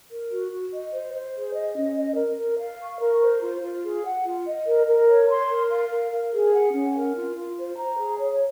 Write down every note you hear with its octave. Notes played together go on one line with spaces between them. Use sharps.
A#4
F#4
F#4
D#5
C5
C5
G#4
D#5
C#4
D#5
A#4
A#4
F5
C#6
A#4
C5
F4
F4
G#4
F#5
F4
D#5
A#4
A#4
C#5
C6
A#4
F5
A#4
A#4
G#4
F#5
C#4
A#4
F4
F4
C5
A#5
G#4
C#5